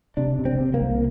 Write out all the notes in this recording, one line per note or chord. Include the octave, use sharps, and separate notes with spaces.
C3 D4
C3
C4
C3
A#3
C2